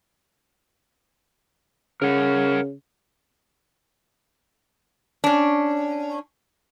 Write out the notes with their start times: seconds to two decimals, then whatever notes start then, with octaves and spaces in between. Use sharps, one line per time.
2.02 C#3 A#4 F#5
5.24 C#4 D4